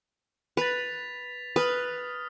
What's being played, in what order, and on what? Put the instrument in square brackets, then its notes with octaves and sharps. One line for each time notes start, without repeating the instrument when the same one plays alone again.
[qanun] B4 [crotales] A6 B6 F7
[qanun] B4 [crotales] D#6 F6